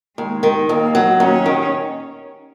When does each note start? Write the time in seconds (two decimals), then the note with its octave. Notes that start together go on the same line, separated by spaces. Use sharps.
0.17 D#2 G#3
0.43 D#3
0.69 D#2 A#3
0.95 F#3
1.20 D#2 C#4
1.46 D#3